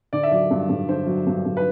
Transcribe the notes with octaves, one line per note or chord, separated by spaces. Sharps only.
D3 D5
E5
F#3 D5
G2
G2
D3 C5
F#3
G2
G2
B4